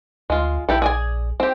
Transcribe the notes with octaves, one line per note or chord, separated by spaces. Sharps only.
D2 G#3 F4
A#1 E4 G4 A4
G#4 D5 G#5
C4 G4